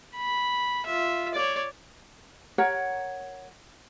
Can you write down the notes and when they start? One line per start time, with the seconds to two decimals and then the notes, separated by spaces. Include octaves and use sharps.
0.16 B5
0.86 F4 E5
1.34 C#5 D5
2.58 A#4 C#5 F#5